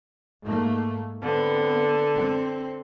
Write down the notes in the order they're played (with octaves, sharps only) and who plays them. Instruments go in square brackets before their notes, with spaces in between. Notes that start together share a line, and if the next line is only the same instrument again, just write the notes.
[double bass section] G#2 A3 A#3
[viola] D3 [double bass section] B3 C4
[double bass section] C4